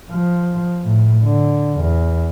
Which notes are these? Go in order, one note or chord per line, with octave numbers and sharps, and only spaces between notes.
F3
A2
D3
E2